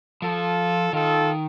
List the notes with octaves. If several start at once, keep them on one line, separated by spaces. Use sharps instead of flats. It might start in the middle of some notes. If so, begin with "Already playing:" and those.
F3 F4 A4
D#3 F4 A4